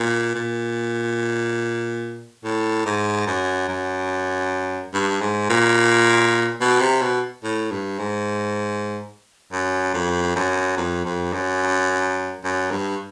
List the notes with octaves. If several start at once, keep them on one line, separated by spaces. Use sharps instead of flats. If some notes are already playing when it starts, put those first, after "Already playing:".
Already playing: A#2
A#2
A2
G#2
F#2
F#2
G2
G#2
A#2
B2
C3
B2
A2
G2
G#2
F#2
F2
F#2
F2
F2
F#2
F#2
G2